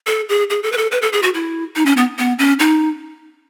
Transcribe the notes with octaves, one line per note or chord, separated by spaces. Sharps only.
A4
G#4
G#4
A4
B4
A4
B4
A4
G#4
F#4
E4
D#4
C#4
B3
B3
C#4
D#4